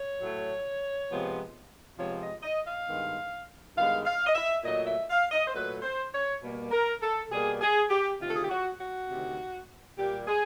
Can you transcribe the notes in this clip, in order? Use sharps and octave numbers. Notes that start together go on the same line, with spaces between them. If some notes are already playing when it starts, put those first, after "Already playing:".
Already playing: C#5
A2 F#3 A3
C3 F3 G#3 B3
C3 F3 G#3 B3 C#5
D#5
D#5
F5
G2 D#3 G#3 B3
G2 D#3 G#3 B3 F5
F5
D#5
E5
A#2 F#3 A3 D#5
E5
F5
D#5
C5
A#2 F#3 A3 B4
C5
C#5
B2 G3 A#3
A#4
A4
B2 G3 A#3 G#4
G#4
G4
D2 C3 D#3 F4
A4
G#4
G4
F#4
F#4
D2 C3 D#3
A#2 G3 A#3 G4
G#4